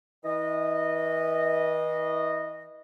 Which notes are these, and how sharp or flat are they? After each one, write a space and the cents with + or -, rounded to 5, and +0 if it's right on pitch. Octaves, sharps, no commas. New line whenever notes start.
E3 -35 D#5 -15